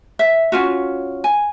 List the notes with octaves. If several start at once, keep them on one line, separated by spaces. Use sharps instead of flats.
E5
C#4 F4 F#4
G#5